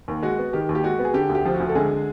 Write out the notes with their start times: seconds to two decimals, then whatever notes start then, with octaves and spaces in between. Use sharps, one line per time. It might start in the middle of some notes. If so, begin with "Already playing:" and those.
0.08 D#2
0.22 G#3 F#4
0.39 B3
0.53 D#3 G4
0.69 D#2
0.75 G4
0.84 G#3 F#4
0.99 B3
1.05 G#4
1.14 D3 G4
1.30 D2
1.35 G4
1.45 F3
1.54 F#4
1.60 D2
1.69 A4
1.75 D3 G#3 G#4